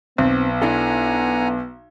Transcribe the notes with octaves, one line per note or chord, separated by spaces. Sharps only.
B1 B3 C4
D4 E4 A4 F#5 G#5 A#5